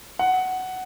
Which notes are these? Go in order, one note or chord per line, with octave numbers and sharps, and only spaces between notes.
F#5